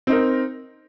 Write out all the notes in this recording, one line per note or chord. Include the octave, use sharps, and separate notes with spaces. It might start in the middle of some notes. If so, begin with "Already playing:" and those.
C4 D#4 A#4